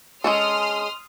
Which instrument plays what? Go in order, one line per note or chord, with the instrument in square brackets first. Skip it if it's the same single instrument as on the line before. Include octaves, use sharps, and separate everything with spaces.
[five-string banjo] G#3 C#4 A4 [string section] C6 D#6 F6